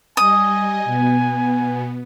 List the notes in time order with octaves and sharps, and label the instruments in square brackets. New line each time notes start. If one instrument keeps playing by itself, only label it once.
[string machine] G3 D#5 [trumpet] G#5 [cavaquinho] D#6
[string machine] B2 B3